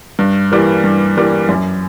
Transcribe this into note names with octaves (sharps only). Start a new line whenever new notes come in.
G2
E3 G3 A#3
G2
E3 G3 A#3
F#2